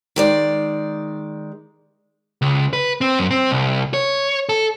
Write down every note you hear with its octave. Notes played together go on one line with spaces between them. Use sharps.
D#3 G#3 D5
C#2
B4
C4
F#2
C4
C2
C#5
A4